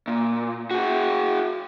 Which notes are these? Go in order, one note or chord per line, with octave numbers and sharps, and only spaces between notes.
A#2
F#4 G#4